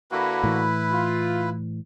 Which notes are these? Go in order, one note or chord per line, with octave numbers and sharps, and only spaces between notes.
D3 A#3 E4 F#4 B4
A2 E3
F4